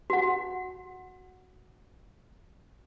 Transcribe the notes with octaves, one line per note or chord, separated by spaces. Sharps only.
F#4 F#5